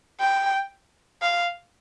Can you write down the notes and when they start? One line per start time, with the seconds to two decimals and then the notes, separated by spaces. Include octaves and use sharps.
0.20 G5
1.22 F5